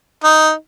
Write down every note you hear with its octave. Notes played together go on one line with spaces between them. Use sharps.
D#4